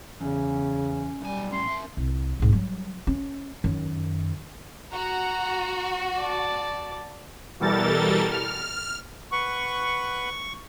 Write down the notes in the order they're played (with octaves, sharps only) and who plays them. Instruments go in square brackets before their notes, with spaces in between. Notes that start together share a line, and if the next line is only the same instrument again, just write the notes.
[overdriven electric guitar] E2 [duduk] C#3 [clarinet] C#4
[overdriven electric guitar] B1 G#5 [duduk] G3
[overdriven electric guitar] A2 C#4 [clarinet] C6
[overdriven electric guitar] A#4 E5
[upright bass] C2
C2 G#2
F#3 G3
C#4
F#2 D#3
[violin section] F#4 [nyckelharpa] F#5 A#5
[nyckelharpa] D5 A5
[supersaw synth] B2 E3 G3 A4 A#4 A6
F6
[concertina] B4 F#5 [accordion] C#6